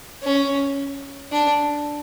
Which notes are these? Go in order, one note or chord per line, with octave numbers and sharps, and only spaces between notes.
C#4
D4